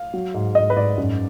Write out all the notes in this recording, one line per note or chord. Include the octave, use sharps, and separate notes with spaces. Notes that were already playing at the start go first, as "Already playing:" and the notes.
Already playing: F5
F#3
G#2
G#2 D#5
B4
G#2 D5
F#2